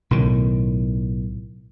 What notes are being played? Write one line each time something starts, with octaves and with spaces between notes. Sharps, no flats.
B1 A2 D#3